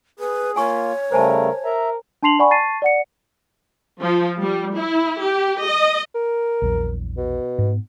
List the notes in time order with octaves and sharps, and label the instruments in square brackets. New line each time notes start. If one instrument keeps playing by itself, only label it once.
[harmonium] G#4 [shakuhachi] B4
[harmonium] A#3 F4 [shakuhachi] C#5 [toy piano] G#5 C#6
[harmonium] C#3 G3 A3 [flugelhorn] A#4 [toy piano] C5 G#5 A5
[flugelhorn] A#4 [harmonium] E5 A#5
[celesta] D4 A5 C6 C7 F7 F#7
D5 F#5 G#5 B5 C#6
A5 C#6 A6 C7 D#7
D5 F#5 C#7
[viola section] F3
G3
E4
G4
D#5
[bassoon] A#4
[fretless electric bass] A#1 E2 F#3
[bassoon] B2
[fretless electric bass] G#2 B3